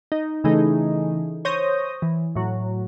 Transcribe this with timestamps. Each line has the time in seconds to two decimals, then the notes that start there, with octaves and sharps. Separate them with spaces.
0.12 D#4
0.44 C#3 E3 A3 D#4 G#4
1.45 C5 C#5 D#6 G6 A#6
2.02 E3
2.36 A2 F#3